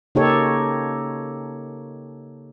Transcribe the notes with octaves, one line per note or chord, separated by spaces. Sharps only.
C#3 A#3 D#4 G4 A4 C#5